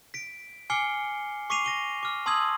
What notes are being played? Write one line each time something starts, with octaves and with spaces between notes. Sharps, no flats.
B6 D7
G#5 D6 F6 C7 C#7 G7
C#6 D6 B6 C7 D#7 F7
A#6 D#7 G7
D6 F6
A5 C6 D#6 E6 G#6 F#7